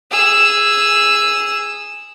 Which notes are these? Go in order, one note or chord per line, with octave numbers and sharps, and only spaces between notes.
G#4 E6